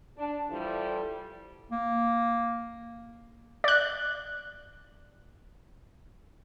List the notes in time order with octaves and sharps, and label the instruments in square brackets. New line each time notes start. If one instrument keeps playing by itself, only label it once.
[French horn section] D4
E3 F3 G3 E4 F4 A4
[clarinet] A#3
[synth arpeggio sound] D5 F#6